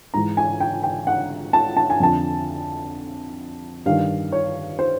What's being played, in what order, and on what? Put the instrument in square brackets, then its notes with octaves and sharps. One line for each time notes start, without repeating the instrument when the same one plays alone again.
[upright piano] G#2 E3 A#5
G#5
G5
G5
F#5
A5
A5
G#5
F2 D3 A5
G2 D#3 F5
C#5
C5